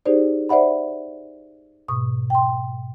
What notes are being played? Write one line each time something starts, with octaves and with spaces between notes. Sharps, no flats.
D#4 G4 G#4 C5 D5
C5 D5 E5 F#5 B5
G#2 B2 C#6 D#6
G5 C6